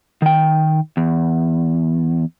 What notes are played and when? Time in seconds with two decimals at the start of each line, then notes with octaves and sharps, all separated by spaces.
0.22 D#3 G5
0.97 E2